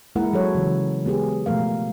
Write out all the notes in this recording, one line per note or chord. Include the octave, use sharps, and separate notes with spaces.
G#3 A#3 E4 A#4 F#5
F#3 A4 C#5
C#3 E3
G#3 B3 G4 G#4
B2 F3 A3 A#4 F5